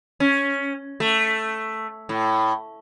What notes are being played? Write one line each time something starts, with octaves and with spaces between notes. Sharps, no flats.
C#4
A3
A2